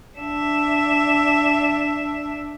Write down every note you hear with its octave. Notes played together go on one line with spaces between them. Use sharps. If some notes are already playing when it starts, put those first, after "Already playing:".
D4 E5